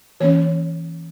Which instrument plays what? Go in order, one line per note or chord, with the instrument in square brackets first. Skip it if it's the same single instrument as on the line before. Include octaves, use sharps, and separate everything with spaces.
[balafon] E3 A#3 C#4 C#5